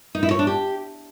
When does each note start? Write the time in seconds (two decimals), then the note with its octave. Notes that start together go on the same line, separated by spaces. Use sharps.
0.15 D#4
0.23 E4
0.31 C#5
0.39 D4
0.47 G4